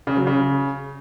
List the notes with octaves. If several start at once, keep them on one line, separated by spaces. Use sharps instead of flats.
C#3
F#3
C#3